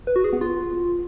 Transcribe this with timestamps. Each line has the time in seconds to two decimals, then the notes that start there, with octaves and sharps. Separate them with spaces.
0.07 B4
0.16 F#4
0.24 G#4
0.33 B3
0.41 F4